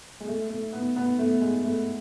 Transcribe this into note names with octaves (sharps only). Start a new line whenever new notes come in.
G#3
A3
A3
B3
B3
A3
G#3
A3